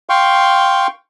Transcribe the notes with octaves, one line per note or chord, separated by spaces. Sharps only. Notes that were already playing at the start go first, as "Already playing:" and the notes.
F5 G5 C6 C#6